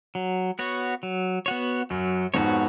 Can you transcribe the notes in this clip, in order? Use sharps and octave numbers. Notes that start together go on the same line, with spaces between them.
F#3
B3 F#4 C#5
F#3
B3 F#4 C#5
F#2 F#3
F2 G#2 B3 F#4 C#5